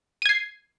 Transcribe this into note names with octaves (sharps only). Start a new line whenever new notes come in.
G#6 C7 D#7